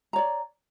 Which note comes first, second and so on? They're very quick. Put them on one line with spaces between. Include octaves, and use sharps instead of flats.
A#5 C#5 D5